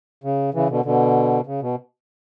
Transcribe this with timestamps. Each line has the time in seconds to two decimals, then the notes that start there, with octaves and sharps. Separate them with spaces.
0.24 C#3
0.54 C#3 E3
0.70 B2 D3
0.85 B2 D3
1.47 C#3
1.62 B2